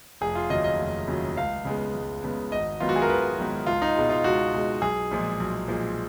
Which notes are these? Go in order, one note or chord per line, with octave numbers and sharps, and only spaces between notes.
F1 G#4
F4
D#2 C#3 F#3 D#5
D#5
F1
D#2 C#3 F#3
C#2 F5
C#3 G#3 B3
C#2
C#3 G#3 B3
G#1 D#5
G#2 D#3 F#3 B3 F4
F#4
G#4
A#4
G#1 B4
G#2 D#3 F#3 B3
C#2 F4
D#4
B2 G#3
F4
C#2 F#4
B2 G#3
B1 G#4
A#2 F3 G#3
B1
A#2 F3 G#3